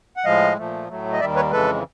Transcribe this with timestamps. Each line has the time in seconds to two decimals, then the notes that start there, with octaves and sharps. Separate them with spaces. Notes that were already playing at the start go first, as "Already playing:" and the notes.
0.16 F#5
0.25 A2 F3 G#3 D#5 F5
0.57 A#2 F3 A3
0.89 A2 F#3 A3
1.13 D#5
1.20 D#2 D#3 G3 D5 E5
1.36 B4 C#5
1.51 F2 C#3 E3 G#3 A4 B4